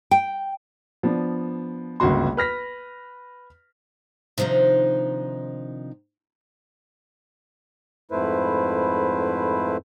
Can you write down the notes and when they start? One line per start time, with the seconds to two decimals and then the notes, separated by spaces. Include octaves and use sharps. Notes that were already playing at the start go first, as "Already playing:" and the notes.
0.11 G5
1.03 F3 B3 D4
2.00 G1 C#2 A#3 F#4 C6
2.37 B4 F6 A#6 B6
4.38 C3 D#3 F3 D4 D#4
8.11 F2 G#2 A3 E4 B4 C5